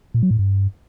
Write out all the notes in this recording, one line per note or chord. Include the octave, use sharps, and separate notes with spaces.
A#2
F#3
A2
G2